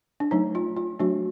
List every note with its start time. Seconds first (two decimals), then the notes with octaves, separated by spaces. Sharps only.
0.20 D4
0.31 F#3 A3 D4 D#4
0.55 F4
0.77 F4
0.99 F#3 A3 D4 F#4